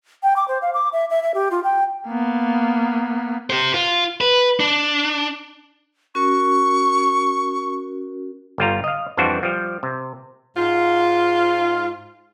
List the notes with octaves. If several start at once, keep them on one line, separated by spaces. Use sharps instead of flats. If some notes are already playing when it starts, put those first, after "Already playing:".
G5
D6
C5
F5
D6
E5
E5
E5
G4
F4
G5
A#3 B3
G4 C5
F4
B4
D4
C#4 F#4 A#4 C#6
G1 G3 F4 A#5
D#5 F5
F2 E3 G3 D4 F#4 C5
F3 G3
C3
G#2 F4